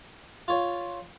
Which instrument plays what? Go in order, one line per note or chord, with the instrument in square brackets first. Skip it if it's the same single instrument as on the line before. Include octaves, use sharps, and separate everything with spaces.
[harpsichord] F4 C#5